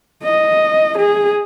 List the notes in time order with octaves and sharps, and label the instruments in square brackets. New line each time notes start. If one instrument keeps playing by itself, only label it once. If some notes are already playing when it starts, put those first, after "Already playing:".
[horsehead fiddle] D#5
G#4